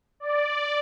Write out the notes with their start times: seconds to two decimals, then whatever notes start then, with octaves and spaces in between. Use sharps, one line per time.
0.20 D5